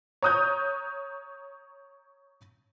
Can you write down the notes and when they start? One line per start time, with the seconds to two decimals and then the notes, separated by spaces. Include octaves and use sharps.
0.22 C#5 A#5 D#6 F#6 G6